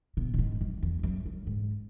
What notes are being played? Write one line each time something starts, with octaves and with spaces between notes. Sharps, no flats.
B2
A#2
G#2
F#2
E2
F#2
F#2
G#2